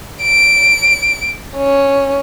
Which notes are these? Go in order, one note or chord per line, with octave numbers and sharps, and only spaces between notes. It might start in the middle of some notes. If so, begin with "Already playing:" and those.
D7
C#4